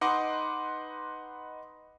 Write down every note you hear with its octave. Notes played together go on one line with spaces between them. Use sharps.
D#4 B4 D#5 F#5 C6 D6